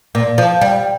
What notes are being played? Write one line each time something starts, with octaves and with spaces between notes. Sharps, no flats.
A#2
F3
G3